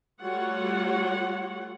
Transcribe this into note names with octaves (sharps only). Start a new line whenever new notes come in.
G3 A3 F4 F#4 C#5 F#5